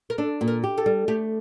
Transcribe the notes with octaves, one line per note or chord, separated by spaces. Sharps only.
A#4
D4 A4
A#2
A#4
G4
A4
G3
A3 G4